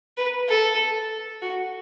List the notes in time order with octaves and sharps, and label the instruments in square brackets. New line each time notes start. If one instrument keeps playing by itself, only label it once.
[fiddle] B4
A4
F#4